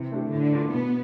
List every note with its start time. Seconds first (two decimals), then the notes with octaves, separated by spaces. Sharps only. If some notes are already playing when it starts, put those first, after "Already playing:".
Already playing: C3 E3
0.11 A3 D4 G4
0.31 A2 D3
0.53 E3 A3 D4 F4
0.73 B2 B3